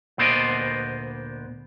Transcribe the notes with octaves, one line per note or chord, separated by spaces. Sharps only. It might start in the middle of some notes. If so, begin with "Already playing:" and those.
D2 A#2 B3 C5 D5 D#5